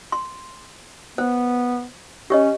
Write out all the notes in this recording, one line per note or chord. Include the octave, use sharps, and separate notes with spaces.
C6
B3 C5
C#4 G4 C#5 D#5